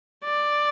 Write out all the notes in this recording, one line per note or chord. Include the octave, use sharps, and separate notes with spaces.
D5